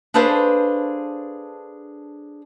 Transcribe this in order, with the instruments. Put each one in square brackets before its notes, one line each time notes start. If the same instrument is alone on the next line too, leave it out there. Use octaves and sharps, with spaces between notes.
[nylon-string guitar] D4 G#4 A4 B4 C5 F5